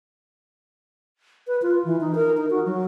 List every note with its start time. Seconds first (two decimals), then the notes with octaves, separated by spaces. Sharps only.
1.47 B4
1.62 F4
1.85 E3
2.01 D#4
2.15 A#4
2.37 D#4
2.50 F#4
2.66 F#3